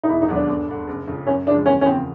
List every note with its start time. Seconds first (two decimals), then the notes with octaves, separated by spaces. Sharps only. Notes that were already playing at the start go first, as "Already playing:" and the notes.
0.03 D#4
0.09 E1 E4
0.21 D#4
0.28 D#2 D3 F#3 B3
0.35 D4
0.48 G1
0.68 G2 D3
0.88 F#1
1.07 F2 C#3 F3
1.27 F#2 C#4
1.47 C#3 F3 G#3 D4
1.66 E2 C#4
1.81 C#4
1.86 C#3 F3 A#3 C4